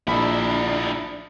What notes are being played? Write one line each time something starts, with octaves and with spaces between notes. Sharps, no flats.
A#1 D4 E4 B5